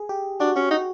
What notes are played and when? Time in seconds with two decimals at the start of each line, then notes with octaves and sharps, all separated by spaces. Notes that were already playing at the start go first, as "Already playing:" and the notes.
Already playing: G#4
0.09 G4
0.40 D4 F#4
0.56 C#4 F#4
0.71 D#4 F#4